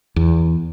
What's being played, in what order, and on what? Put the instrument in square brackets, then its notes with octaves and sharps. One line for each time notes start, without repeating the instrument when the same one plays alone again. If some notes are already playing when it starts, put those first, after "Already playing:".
[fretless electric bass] E2